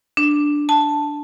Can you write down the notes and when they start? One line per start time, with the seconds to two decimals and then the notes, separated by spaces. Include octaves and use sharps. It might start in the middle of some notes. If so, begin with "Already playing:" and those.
0.17 D4
0.69 A5